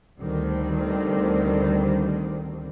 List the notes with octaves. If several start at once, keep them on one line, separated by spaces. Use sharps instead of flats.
D2 D3 D#3 G3 C4